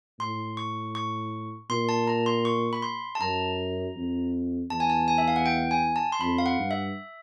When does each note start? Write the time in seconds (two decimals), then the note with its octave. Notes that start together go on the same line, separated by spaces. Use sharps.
0.20 A2 C6
0.57 C#6
0.95 C#6
1.70 A#2 C6
1.89 A5
2.07 A#5
2.26 C6
2.45 C#6
2.73 B5
2.82 C6
3.15 A5
3.21 F#2 A#5
3.96 F2
4.70 E2 A5
4.80 G#5
4.90 A5
5.08 G#5
5.18 E5
5.28 F5
5.36 F#5
5.46 G5
5.71 G#5
5.96 A5
6.12 C6
6.20 F2 B5
6.38 F5
6.46 F#5
6.59 G2
6.71 E5